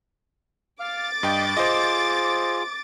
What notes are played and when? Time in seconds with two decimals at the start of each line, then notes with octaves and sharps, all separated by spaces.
0.80 F5 D6 A6
1.23 G2 D#5 G5
1.57 F4 G#4 C5 D#5